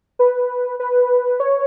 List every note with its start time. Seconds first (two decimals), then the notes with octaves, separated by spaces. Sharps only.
0.19 B4
0.80 B4
1.40 C#5